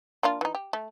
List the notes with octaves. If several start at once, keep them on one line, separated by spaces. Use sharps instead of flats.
A#3 D4 F4
E3 D#4
G4
A3